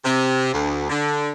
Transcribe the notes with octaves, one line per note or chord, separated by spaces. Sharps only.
C3
D2
D3